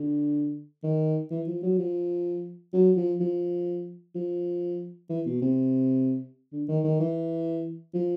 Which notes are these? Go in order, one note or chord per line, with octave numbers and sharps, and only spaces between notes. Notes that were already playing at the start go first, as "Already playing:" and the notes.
Already playing: D3
D#3
E3
F3
F#3
F3
F#3
F3
F3
F3
E3
B2
C3
D3
D#3
D#3
E3
F3